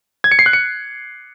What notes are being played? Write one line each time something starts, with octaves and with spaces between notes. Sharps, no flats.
G#6
C#7
C7
F#6
C#7